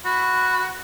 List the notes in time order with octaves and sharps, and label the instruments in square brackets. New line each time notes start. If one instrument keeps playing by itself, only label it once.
[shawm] F#4 [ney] B5